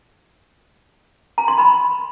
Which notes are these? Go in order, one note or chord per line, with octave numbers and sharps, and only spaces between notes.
A#5
C6
B5